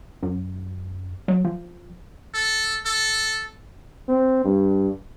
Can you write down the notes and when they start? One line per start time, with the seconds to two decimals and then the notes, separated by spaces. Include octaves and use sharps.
0.23 F#2
1.28 F#3
1.45 F3
2.34 A4
2.86 A4
4.08 C4
4.44 G2